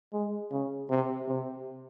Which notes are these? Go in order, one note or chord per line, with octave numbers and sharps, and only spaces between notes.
G#3
C#3
C3
C3